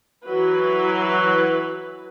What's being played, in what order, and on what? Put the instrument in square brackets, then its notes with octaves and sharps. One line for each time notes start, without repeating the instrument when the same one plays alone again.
[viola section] E3 F#3 B4